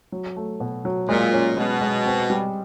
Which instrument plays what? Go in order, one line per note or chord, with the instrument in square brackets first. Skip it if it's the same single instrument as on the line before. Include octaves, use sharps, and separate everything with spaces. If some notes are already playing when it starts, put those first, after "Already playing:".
[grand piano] F#3
A3
B2
F#3
[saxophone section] A#2 [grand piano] G#3
[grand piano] C#4
[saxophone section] B2 [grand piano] G#3
[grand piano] G#3
C4
G3